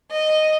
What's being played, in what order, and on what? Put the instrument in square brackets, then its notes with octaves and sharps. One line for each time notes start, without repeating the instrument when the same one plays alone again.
[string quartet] D#5